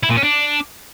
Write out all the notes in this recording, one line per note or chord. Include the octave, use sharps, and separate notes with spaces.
E4
A#2
C#4
D4